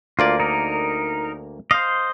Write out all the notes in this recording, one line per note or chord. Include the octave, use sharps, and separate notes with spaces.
D2 A#3 F4 D5
D#4 A#4
C5 D#5 F5